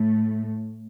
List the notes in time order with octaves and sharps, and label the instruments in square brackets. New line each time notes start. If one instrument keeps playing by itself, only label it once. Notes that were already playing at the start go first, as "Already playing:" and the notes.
Already playing: [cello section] A2 A3